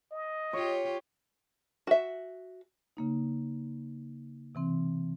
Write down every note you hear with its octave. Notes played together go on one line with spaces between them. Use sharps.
D#5
F4 G4 C#5
F#4 E5
C#3 A#3 D#4
C3 E3 C4